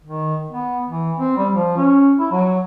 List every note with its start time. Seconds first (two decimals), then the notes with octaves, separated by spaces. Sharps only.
0.04 D#3
0.51 B3
0.89 E3
1.17 C4
1.37 G3
1.52 F3
1.77 C#4
2.19 E4
2.31 F#3